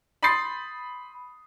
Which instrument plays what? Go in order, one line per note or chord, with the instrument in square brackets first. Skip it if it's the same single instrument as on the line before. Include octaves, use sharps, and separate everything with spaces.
[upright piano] B5 C6 D#6 G6 A6 C7